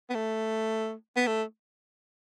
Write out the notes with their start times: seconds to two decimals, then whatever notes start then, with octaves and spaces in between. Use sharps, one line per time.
0.10 B3
0.15 A3
1.16 B3
1.27 A3